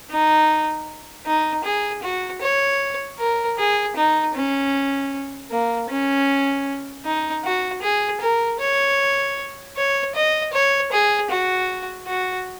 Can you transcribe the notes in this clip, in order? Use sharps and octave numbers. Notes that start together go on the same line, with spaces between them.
D#4
D#4
G#4
F#4
C#5
A#4
G#4
D#4
C#4
A#3
C#4
D#4
F#4
G#4
A#4
C#5
C#5
D#5
C#5
G#4
F#4
F#4